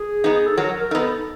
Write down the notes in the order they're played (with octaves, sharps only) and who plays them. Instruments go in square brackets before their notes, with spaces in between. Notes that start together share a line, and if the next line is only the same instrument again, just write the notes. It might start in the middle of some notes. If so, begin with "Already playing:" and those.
Already playing: [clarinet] G#4
[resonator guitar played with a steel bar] B3 D#4
[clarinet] A4
[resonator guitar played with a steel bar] F#3 [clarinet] A#4
[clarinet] A#4
[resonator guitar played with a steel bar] B3 D#4 [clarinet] A4